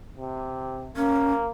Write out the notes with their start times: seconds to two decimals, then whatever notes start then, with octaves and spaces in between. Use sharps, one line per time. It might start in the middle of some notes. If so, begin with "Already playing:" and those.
0.17 C3
0.97 A#3 C#4